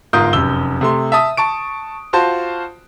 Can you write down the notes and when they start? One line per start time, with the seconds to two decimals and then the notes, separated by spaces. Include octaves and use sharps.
0.13 G1 G#2 F4 A#4 D#6 G6
0.33 F1 F#2 E6 G7
0.81 C3 A3 C6
1.12 E5 A5 D#6
1.37 A5 C#6 D7
2.13 F4 F#4 C5 A5